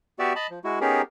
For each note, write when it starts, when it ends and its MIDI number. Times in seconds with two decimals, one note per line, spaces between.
0.19 0.33 59
0.19 0.33 66
0.19 0.33 67
0.19 0.33 74
0.19 0.33 76
0.36 0.47 75
0.36 0.47 81
0.36 0.47 83
0.50 0.59 53
0.64 0.79 56
0.64 0.79 64
0.64 0.79 66
0.81 1.02 59
0.81 1.02 61
0.81 1.02 63
0.81 1.02 67
0.81 1.02 68
0.81 1.02 70